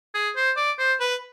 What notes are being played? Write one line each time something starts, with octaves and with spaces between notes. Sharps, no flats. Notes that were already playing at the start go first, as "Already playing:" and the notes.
G#4
C5
D5
C5
B4